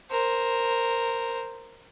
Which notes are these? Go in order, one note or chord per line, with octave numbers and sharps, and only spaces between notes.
A#4 C5